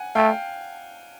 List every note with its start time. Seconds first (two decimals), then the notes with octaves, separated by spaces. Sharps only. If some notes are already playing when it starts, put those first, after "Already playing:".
Already playing: F#5 G#5
0.15 A3 F5 G5